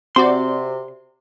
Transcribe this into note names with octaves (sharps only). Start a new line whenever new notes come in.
C3 C4 F#4 D5 C6